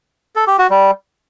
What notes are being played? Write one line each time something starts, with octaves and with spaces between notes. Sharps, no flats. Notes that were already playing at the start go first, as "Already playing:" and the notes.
A4
G4
F#4
G3